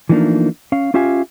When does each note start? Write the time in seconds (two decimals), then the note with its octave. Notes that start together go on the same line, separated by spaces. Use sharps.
0.09 E3 F3 A3 A#3 D4 D#4
0.72 C#4 F5
0.94 C#4 F4 G4 E5 F5 G#5